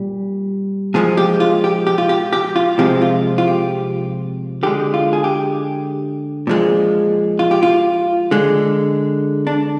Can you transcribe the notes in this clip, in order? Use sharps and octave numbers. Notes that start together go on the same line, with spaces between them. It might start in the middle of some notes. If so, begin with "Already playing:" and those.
Already playing: A#2 G3
A#2 F3 G#3 G#4
G4
F4
G4
G4
F4
G4
G4
F4
C3 F3 G#3 G4
F4
F4
G4
D3 G#3 G4
F4
G#4
G4
A#2 F3 G#3
F4
G4
F4
D3 G#3
D4